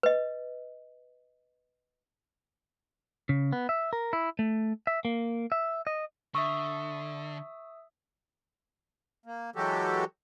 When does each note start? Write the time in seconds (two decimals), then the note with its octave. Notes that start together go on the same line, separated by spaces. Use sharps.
0.03 B4 D#5
3.29 C#3
3.53 B3
3.69 E5
3.93 A#4
4.13 E4
4.39 A3
4.87 E5
5.05 A#3
5.52 E5
5.87 D#5
6.35 D3 E5 C#6 D#6 E6
9.26 A#3
9.56 E3 F#3 G#3 F#4 G4 A4